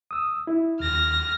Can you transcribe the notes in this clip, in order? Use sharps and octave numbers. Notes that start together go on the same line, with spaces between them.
D#6 E6
E4
D#2 F6 A#6